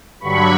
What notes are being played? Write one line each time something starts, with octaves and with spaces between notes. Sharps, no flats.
G2 D3 F#3 B5 C#6